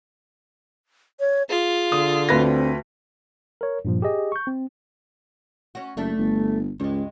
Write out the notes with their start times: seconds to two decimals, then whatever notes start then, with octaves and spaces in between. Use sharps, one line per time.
1.20 C#5
1.50 F4 G#4
1.92 D3 D#6
2.29 D2 C4 B4 A#6
3.61 A#4 C#5
3.85 G2 A#2 F3
4.02 G4 G#4 D#5
4.32 C#6 G6
4.47 C4
5.75 C#4 F#4
5.97 F#1 A3 D4
6.18 G1
6.80 C#2 G2 G#3